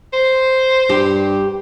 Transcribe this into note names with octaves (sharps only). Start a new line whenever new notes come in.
C5
G2 G4